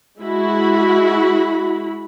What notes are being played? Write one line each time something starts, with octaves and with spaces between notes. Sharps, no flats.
G#3 E4 F#4 B5